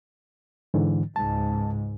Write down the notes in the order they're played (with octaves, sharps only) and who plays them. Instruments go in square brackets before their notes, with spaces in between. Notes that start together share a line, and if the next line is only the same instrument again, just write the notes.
[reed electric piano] G#2 D3 E3
[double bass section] C#2 G#2 [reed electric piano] A5